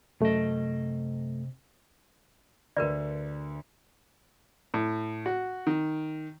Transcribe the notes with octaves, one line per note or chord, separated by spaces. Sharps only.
F#2 C3 A3 D#5
D2 D3 A#4 B4 D5
A2
F#4
D#3